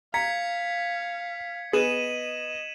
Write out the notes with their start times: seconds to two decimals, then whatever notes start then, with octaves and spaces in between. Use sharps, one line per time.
0.14 F5 A#5 G#6 B6 C#7
1.73 B3 G#4 D#5 D#7 E7 F#7